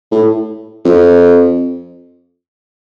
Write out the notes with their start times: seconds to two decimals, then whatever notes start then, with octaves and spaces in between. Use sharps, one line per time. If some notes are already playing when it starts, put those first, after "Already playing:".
0.12 A2
0.85 F2